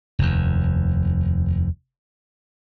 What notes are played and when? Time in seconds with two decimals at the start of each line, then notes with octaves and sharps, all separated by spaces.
0.19 F1 D#2